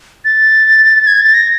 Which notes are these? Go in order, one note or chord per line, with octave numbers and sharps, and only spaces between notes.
A6
G#6
A6
A#6